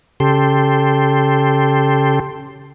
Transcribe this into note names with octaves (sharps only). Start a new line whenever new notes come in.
C#3 G4 A4 C6